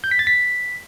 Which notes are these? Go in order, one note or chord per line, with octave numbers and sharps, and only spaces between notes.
G6
B6
A6
B6